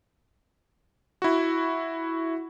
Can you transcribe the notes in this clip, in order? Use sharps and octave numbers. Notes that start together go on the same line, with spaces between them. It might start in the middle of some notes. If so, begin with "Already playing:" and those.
E4 F#4